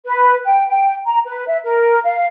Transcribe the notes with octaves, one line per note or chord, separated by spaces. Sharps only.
B4
G5
G5
A#5
B4
E5
A#4
F5